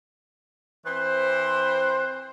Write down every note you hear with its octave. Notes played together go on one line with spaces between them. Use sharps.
E3 C4 B4 C5